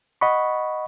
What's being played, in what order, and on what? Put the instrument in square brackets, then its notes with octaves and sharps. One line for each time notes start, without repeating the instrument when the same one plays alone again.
[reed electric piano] D#5 F#5 B5 C#6